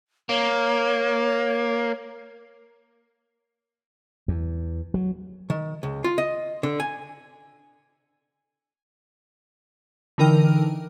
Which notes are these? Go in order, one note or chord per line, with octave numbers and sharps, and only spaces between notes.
A#3 C#5
E2
F#3
D#3
C#2
F4
D#5
D3
G#5
D3 E3 D#4 A#4 G5 F6